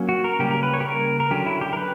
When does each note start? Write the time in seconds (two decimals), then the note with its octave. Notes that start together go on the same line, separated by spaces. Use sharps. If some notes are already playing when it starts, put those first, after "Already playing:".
Already playing: F#3 A#3 C#4
0.09 F#4
0.24 A#4
0.39 C#3 G3 A#3 C#4 G4
0.51 A#4
0.63 B4
0.74 C#5
0.80 G4
0.85 A#4
1.20 A#4
1.31 D3 F#3 C#4 G4
1.46 E4
1.61 G4
1.73 A#4
1.77 B4